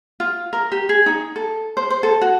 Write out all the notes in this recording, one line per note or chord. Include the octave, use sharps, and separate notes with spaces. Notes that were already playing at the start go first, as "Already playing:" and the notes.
F4
A#4
G4
G#4
D#4
A4
C5
C5
A4
F#4